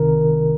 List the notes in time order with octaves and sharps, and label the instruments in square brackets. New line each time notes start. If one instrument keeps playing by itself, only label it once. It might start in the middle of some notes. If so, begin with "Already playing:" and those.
Already playing: [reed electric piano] C2 C3 D#3 A#4